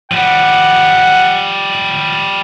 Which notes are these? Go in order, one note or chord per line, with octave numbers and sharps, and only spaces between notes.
F3 G3 F#5